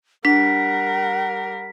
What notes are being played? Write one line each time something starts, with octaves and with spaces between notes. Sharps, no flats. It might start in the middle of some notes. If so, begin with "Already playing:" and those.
G3 D4 A#4 F#5 B6